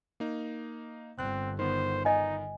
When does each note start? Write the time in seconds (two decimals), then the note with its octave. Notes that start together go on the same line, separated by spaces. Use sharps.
0.20 A#3 D#4
1.19 G1 D3 C4 F#6
1.59 D#3 B3 C5
2.05 D#4 D#5 G#5